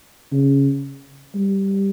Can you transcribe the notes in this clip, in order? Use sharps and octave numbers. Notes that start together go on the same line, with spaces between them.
C#3
G3